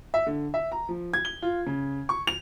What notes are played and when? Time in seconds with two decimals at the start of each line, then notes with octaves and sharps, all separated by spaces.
0.14 E5
0.27 D3
0.54 E5
0.72 A#5
0.89 F3
1.14 G#6
1.25 G7
1.42 F4
1.67 C#3
2.09 C#6
2.27 F7